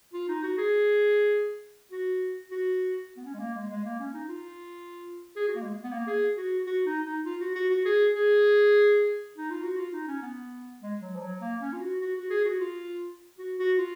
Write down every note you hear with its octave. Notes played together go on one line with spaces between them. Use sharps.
F4
D#4
F#4
G#4
F#4
F#4
B3
C#4
G#3
A#3
G#3
G#3
A#3
C#4
D#4
F4
G#4
F#4
A#3
G#3
B3
A#3
G#4
F#4
F#4
D#4
D#4
F4
F#4
F#4
F#4
G#4
G#4
D#4
F4
F#4
F4
D#4
C#4
B3
G#3
F#3
F3
F#3
A#3
C#4
F4
F#4
F#4
F#4
G#4
F#4
F4
F#4
F#4
F4